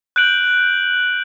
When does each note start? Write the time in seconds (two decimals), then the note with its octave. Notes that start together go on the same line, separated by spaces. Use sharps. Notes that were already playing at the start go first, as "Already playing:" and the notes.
0.16 F#6 G6 D7 F#7